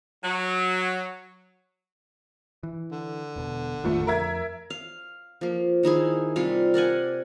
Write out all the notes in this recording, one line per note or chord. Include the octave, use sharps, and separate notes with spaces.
F#3
E3
D3
E1 B2
A1 F2 A#2 D#3 F3 A3
F2 A#4 E5 G#6
F5
F3 A#3
D#3 D#4 E4 G#4
C3 G3 F4 F5
A#4 D5 F#5 G#5